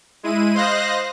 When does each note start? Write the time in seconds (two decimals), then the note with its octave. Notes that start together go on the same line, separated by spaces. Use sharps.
0.23 G#3 E4 D#7
0.55 C5 D#5 F5 F#6 A#6